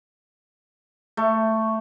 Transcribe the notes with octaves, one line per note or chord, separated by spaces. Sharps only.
A3